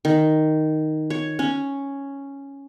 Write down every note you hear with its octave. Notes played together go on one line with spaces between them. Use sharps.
D#3
C#5
C#4